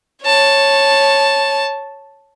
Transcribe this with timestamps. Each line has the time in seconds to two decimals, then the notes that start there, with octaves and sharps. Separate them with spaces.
0.23 C#5 A5